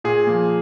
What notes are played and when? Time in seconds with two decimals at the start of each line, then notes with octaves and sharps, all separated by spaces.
0.04 A#2 G#4
0.27 F3 A#3